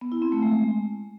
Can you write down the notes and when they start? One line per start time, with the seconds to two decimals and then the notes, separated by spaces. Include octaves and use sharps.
0.01 B3
0.12 E4
0.22 C4
0.32 A3
0.42 G#3